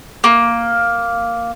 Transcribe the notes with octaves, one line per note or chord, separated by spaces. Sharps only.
A#3